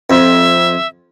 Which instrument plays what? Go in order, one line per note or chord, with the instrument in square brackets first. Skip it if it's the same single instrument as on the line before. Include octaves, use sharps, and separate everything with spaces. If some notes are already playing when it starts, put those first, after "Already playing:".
[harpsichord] F2 [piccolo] E5